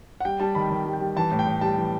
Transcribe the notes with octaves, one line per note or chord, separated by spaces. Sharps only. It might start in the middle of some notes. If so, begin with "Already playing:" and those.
F#5
G3 G5
G3 A5
D#3 B5
D#3
G3
G5
G3
E3 A5
A2
G5
A2
G3 A5
E3